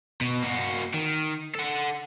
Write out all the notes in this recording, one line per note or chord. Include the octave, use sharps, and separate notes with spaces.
B2
A#3 F#4
D#3
A4 F#5